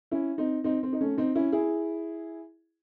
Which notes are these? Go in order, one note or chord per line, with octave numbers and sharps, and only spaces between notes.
C#4 E4
C4 D#4
C4 D#4
C4
D#4
A3 C#4
C4 D#4
C#4 E4
E4 G#4